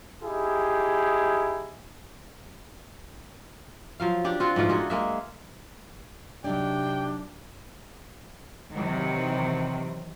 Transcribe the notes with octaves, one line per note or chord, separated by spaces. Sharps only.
D#4 E4 G4 G#4
F3 F#3 F5
D4 G4 D5
C4 F4 F#4
G#2 B2 F3 A3
A#3 F#4 G#4 A4
G#3 A#3 E5
C3 F#3 D4 D#4 D5 G5
C3 D#3 E3 F#3